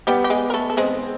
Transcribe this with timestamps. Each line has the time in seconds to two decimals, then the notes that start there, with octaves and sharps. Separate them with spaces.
0.07 G3 B3 G4
0.24 G4
0.30 G#3 G#4
0.50 A#4
0.54 A3 A4
0.70 A4
0.77 G#3 C4 G#4